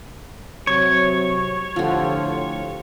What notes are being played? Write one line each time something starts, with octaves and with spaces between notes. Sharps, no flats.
C3 F#3 C#5
A2 D3 F3 F4 G4